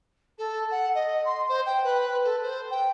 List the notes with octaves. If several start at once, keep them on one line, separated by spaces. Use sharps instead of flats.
A4
F#5
D#5
C6
C5
G5
B4
A4
C5
G5